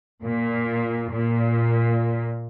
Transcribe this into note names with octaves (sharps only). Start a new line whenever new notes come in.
A#2
A#2